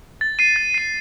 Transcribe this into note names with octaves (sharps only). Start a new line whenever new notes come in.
A6
C7 D#7
A6
C7 D#7